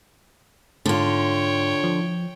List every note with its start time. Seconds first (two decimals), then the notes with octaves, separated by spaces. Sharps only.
0.86 G#2 D3 F4 C#5 G5
1.84 F3